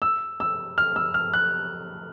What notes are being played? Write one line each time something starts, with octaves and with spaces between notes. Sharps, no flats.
E6
E6
F6
E6
F6
F#6